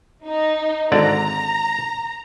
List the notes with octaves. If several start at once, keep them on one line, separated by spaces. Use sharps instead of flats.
D#4
G#1 D3 D5 A#5